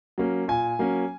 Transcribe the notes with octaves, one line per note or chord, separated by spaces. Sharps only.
F#3 A#3 C#4
A#2 G#5
F#3 A#3 C#4